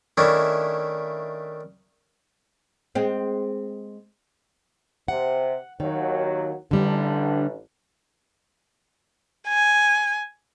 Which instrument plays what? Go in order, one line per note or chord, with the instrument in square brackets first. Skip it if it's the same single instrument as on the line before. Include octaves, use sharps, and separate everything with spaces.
[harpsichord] D#3 A3 C#4 D4 E4
[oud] G#3 C4
[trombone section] C3 [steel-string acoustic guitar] F#5
[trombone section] D#2 F#3 [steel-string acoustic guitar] D#3
[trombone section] A1 [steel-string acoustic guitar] D3 G3 D4
[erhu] G#5